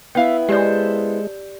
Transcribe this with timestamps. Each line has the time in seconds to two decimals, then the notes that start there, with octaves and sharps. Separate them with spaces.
0.15 B3 E4 E5 F5 G5 G6
0.49 G#3 G4 A4 C5 D5 G6